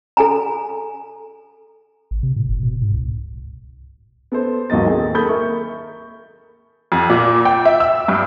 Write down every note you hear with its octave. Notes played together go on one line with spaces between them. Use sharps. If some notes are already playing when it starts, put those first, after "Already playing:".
A4 G#5 A#5
G#1
C3
A2
F#1
B2
G#2
C2
B3 A4 C5
G#1 D#2 F#3 D#5 A6
D#3 C4 G#4 A4
A#3 A4 B5 D#6 G6
A#4 E5 C#6
F2
A#2
G5
E5
E6
G2